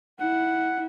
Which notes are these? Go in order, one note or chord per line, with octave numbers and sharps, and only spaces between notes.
E4 F#5